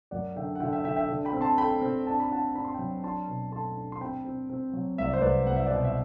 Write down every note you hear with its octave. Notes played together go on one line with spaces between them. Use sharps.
F#2 D5 F#5
D3 E5 G5
F#5
D3 E5 G5
E5 G5
D3 E5 G5
E5 G5
D3
G5 B5
C4
A5 C6
A3 G5 B5
C4
D4 A5
B5
D4 F#5 A5
D4 B5
C6
F#3 G5 B5
D4 A5 C6
B2
A3 A5 C6
D4
C6
C4 G5 B5
C4
C4
F#3
C2 E5
D5
C5
C2 B4 D5
C2 F#5
E5
B2 D5 F#5
E5